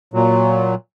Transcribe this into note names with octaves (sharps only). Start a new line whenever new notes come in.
A#2 F#3